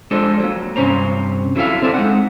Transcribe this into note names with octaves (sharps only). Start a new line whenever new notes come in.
G#3 D4 F4 A4 C5 D#5
F#3 A#3
G2 C3 E3 C#4 C5 A#5
F#3 E4 A4 E5 F5
C4 E4 A4 D5
G#3 D#4 F#5